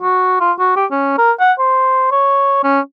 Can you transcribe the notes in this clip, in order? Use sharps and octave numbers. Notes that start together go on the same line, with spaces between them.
F#4
F4
F#4
G4
C#4
A#4
F#5
C5
C#5
C#4